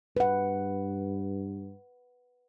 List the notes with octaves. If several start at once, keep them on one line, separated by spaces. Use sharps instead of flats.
G2 B4 F#5